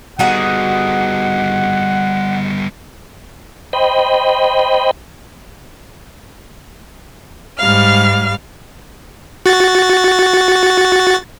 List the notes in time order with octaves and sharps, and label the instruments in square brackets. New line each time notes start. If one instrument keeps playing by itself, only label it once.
[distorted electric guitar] G3 B3 [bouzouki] D#4 F#4 G#4 [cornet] F#5
[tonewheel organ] C5 D#5 G5 B5
[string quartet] G#2 G3 F5 F6
[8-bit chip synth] F#4 A6